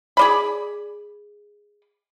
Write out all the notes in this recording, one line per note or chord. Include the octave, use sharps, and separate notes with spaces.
G#4 D5 B5